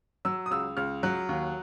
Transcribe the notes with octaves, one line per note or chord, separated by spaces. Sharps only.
F#3 E6
D#6
C#2 E6
C#2 F6
F#3 F#6
D#2